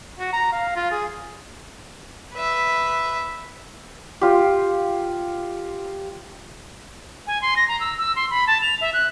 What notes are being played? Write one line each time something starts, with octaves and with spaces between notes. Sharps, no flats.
F#4
A#5
F5
F4
G#4
B4 E5
F4 G4
G#5
C6
A#6
A#5
E6
E6
C6
B5
A5
F7
E5
F#6